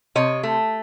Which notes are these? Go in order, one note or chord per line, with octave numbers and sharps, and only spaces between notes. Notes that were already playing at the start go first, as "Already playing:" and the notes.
C3 C#5 D#5
A3